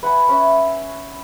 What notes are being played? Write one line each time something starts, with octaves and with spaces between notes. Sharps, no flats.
B4 F#5 G#5 B5
C#4 C#5 E5